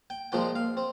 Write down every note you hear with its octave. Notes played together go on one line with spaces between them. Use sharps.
G5
A#2 F3 G#3 C4 G5
F5
C4